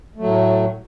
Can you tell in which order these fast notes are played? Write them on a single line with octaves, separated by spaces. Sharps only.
A3 F#3 A2